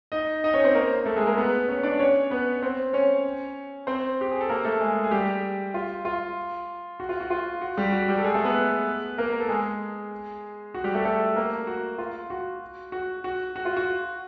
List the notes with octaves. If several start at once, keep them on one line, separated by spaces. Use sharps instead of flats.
D#4 D#5
D#4 D#5
C#4 C#5
C4 C5
A#3 A#4
A3 A4
G#3 G#4
A#3 A#4
B3 B4
C#4 C#5
D4 D5
C#4 C#5
B3 B4
C4 C5
C#4 C#5
C4 C5
G4
G#4
A4
A#3 A#4
A3 A4
G#3 G#4
G#4
G3 G4
F4
F4
F#4
F4
F#4
F4
F#4
G3 G4
F#4
G3 G4
A4
G#3 G#4
A3 A4
B3 B4
A#3 A#4
A#4
A4
G#3 G#4
F#4
G3 G4
A3 A4
A3 A4
A#3 A#4
F#4
F4
F#4
F#4
F#4
F#4
F4
F#4